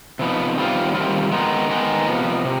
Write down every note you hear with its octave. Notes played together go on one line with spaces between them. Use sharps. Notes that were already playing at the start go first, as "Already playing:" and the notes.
C3 F3 B3 D#4
D#3 G3 C4 F4
D#3 G3 C4 F4
D#3 G#3 B3 D#4
D#3 G#3 B3 D#4
C3 F3 B3
C3